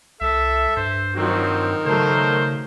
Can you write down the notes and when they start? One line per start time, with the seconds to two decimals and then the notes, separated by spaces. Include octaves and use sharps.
0.21 C2 A4 E5
0.77 G2 C5
1.16 D#3 F3 F#3 C4 F#4
1.86 C#3 F#3 A3 A#4 C5